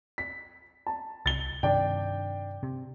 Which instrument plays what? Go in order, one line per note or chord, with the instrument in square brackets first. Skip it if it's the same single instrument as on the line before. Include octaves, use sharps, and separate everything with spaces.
[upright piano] B6
A5
[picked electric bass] C2 [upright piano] A6 G7
[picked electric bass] G2 C3 D#3 [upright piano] D4 G5
[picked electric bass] C3